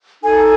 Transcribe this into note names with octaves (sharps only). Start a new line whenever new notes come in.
D#4 F#4 A4 G#5